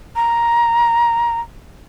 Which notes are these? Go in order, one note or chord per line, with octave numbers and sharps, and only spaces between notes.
A#5